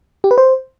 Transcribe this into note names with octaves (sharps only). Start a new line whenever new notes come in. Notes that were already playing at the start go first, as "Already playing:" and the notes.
G4
B4
C5